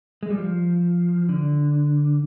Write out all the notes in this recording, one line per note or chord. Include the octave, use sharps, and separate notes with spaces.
G#3
G3
F3
D3